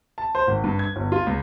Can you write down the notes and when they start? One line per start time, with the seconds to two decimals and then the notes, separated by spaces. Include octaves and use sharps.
0.18 A5
0.35 C5
0.47 G#1
0.64 G2
0.79 G#6
0.96 G1
1.12 F4
1.27 C#2